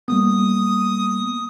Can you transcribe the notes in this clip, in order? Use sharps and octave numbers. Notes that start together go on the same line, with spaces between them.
G3 A#3 B3 D#6